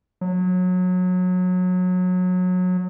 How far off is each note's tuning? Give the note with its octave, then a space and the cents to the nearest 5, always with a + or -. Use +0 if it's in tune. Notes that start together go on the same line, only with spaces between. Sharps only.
F#3 -25